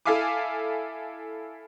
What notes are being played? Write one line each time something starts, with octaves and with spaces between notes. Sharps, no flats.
E4 A4 E5 F5 G#5 D6